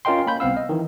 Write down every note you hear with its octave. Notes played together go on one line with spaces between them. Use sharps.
C#4 F4 A#4 D#5 G5 C6
A#3 B5 G6
C2 B3 C4 F5 E6
D#5
D#3 E3